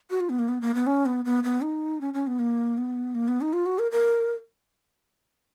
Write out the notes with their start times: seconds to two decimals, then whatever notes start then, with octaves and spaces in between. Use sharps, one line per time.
0.10 F#4
0.21 F4
0.29 B3
0.39 A#3
0.49 B3
0.61 A#3
0.75 B3
0.87 C#4
1.06 B3
1.25 B3
1.44 B3
1.63 D#4
2.01 C#4
2.14 C#4
2.27 B3
2.39 A#3
2.78 B3
3.15 A#3
3.28 B3
3.41 D#4
3.53 F4
3.66 F#4
3.79 A#4
3.92 A#4